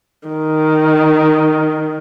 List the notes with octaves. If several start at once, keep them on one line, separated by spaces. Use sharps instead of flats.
D#3